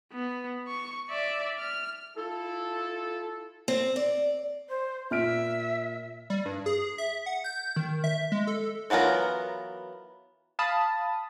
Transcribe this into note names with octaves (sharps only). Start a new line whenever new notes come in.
B3
C#6
D5 E5
F6
E4 F4 A4
C4
D5
C5
A#2 E5 F6 D7
G3
G2
G#4
E5
F#5
G6
D#3
E5
G#3
A4
E3 F#3 B3 F4 A#4
F5 A5 B5 D#6